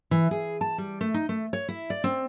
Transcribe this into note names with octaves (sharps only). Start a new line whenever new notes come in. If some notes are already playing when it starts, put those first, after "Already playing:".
E3
G#4
A5
G3
A3
D#4
A3
C#5
E4
D5
C4